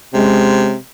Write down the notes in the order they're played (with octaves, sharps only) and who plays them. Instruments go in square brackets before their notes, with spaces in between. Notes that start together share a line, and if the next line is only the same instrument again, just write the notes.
[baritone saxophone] C3 [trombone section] G#3 C#4